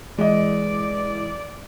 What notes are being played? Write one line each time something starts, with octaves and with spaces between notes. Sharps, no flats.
E3 G#3 D5 D#5